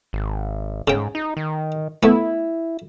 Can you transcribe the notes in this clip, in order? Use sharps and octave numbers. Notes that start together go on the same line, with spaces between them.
G#1
G#2 C#3 G5
D#4
D#3
A3 B3 E4